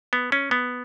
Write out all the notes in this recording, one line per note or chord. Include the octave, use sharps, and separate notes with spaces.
B3
C#4
B3